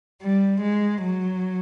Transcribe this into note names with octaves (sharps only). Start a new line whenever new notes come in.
G3
G#3
F#3